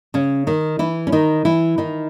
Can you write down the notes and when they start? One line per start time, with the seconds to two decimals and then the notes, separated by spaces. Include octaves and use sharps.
0.14 C#3 C#4
0.47 D#3 D#4
0.79 E3 E4
1.07 C#4
1.12 D#3 D#4
1.45 E3 E4
1.78 D#3 D#4